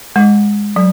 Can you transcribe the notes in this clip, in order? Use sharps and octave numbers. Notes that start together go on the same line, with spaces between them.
G#3
F#3